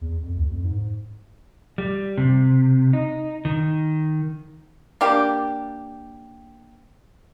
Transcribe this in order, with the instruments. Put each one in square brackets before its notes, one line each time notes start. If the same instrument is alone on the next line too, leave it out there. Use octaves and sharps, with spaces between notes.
[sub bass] E2
F2
D2
F2
G#2
G#2
[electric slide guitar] G3
C3
D#4
D#3
[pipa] A#3 D4 G4